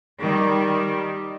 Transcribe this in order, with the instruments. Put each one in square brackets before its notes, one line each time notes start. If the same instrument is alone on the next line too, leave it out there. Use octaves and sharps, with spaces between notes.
[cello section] D#3 G3